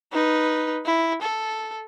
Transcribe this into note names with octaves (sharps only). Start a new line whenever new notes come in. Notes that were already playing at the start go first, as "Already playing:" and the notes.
D#4 B4
E4
A4